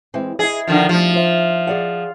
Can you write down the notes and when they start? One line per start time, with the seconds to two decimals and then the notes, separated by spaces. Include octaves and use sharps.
0.14 E3 G#3 C4
0.39 E4 G#4 D#5
0.67 D3 D#3 F3
0.89 F3 G3 A3
1.14 F4 C5 E5
1.67 G#4 D5 F#5